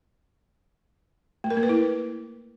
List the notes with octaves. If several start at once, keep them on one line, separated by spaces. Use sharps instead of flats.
A3
A#4
A#3
B4
E4